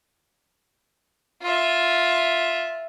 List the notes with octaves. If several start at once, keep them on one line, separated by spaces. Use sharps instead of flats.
F4 E5